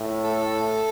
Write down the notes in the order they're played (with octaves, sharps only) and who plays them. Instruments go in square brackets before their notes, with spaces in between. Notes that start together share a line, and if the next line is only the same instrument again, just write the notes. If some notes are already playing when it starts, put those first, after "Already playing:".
Already playing: [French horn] A2
[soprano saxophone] A4